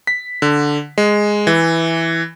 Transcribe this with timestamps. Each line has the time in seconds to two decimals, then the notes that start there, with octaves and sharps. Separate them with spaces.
0.07 B6
0.42 D3
0.98 G#3
1.47 E3